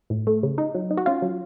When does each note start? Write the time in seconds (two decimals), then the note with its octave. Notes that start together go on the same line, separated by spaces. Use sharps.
0.10 A2
0.27 A3
0.43 C#3
0.58 D#4
0.75 F#3
0.91 D#4
0.97 F#4
1.06 C#4 F4
1.22 F#3